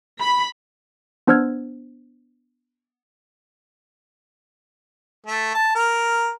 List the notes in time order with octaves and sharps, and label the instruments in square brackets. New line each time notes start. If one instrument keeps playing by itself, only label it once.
[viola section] B5
[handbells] B3 D4 C5 E6 F6 G#6
[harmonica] A3
A5
A#4